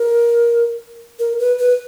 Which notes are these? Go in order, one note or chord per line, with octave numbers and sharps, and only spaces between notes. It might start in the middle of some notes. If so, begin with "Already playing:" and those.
Already playing: A#4
A#4
B4
B4